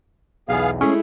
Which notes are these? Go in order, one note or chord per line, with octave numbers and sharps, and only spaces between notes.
B1 E2 B3 G#4 F5
G#3 A3 C#4 E4 G#4